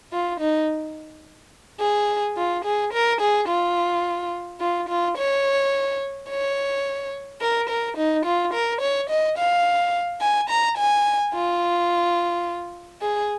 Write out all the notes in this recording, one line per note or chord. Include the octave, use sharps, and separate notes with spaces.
F4
D#4
G#4
F4
G#4
A#4
G#4
F4
F4
F4
C#5
C#5
A#4
A#4
D#4
F4
A#4
C#5
D#5
F5
G#5
A#5
G#5
F4
G#4